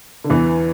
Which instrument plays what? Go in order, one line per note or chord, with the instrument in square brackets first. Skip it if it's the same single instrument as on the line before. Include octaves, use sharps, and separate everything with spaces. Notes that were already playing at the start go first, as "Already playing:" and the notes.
[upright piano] D3
E2 E3